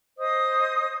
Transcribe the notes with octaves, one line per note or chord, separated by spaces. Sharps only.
C5 D#5 D#6